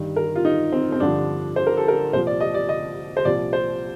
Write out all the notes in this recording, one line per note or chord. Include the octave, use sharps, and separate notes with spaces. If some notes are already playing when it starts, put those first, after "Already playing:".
Already playing: G2 D#3
A#4
F4
D#4
C4
C4
G2 D3 F3 D4
C5
A#4
A4
A#4
C2 A#2 F3 C5
D5
D#5
D5
D#5
C5
C2 A#2 F3 D5
C5